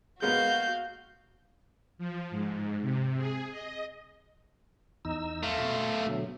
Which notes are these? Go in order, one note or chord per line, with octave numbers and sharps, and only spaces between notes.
G#3 A#3 B3 F#4 F5 G6
F3
G#2
C3
G#4
D#5
E2 D#4 E6
A3 F4
B2
B2 D3 F#3